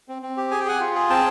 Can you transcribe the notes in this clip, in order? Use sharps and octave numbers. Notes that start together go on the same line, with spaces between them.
C4
C4
G4
G#4 G#5
G5
G#4 F#5 G#5
F4
G#4
C4 G5 A5